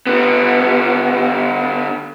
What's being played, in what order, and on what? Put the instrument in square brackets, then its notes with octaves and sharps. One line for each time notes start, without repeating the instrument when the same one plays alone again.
[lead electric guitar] D3 B3